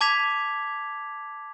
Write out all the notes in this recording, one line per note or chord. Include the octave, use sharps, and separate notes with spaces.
A5 D6 G#6 B6 F7